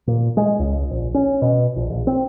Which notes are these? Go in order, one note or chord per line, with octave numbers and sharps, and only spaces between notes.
A#2
G#3
C#2
A#1
C#4
B2
A#1
A#1
C4